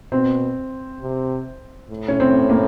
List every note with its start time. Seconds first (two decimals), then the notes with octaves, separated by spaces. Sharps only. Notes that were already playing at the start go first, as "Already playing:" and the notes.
0.12 B2 C4
1.02 C3
1.90 A2
2.08 C#4
2.20 C4
2.50 A#3